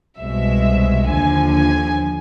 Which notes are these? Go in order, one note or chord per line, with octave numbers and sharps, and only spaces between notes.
C2 B2 G#3 E5
D#2 D3 F3 G#5
G#5